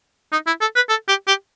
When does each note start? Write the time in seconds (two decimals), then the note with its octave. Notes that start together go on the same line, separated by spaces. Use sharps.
0.32 D#4
0.47 E4
0.61 A4
0.76 B4
0.89 A4
1.08 G4
1.27 G4